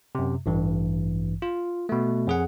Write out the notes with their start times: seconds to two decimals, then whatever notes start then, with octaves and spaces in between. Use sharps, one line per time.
0.15 F#2 C3
0.46 A1 G2 E3
1.42 F4
1.89 B2 A3
2.27 F2 G#4 F#5